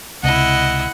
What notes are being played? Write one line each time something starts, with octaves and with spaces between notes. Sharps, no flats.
C#2 C3 E4 D#5 F#5